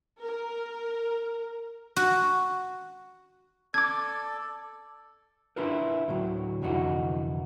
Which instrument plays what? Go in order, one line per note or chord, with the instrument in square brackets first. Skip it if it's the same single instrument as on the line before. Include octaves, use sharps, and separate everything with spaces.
[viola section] A#4
[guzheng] F#4
[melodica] A4 D5 [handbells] D6 G#6
[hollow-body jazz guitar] D4 E4 F4 A#4 B4
D2 A2 F#3
C2 F2 D3 E3 D#4 F#4